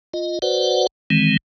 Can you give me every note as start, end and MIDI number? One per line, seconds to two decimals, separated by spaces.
0.14 0.39 65
0.14 0.39 75
0.42 0.87 66
0.42 0.87 71
0.42 0.87 72
0.42 0.87 74
0.42 0.87 78
1.10 1.37 51
1.10 1.37 52
1.10 1.37 56
1.10 1.37 60